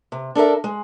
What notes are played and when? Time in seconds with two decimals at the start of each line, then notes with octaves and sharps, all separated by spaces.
0.12 C3
0.35 D4 A4 A#4 E5
0.64 G#3